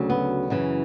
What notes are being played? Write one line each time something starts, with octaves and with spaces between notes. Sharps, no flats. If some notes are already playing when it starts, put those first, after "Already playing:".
Already playing: D2 C#3 F#3
B3
F#2 C#3 E3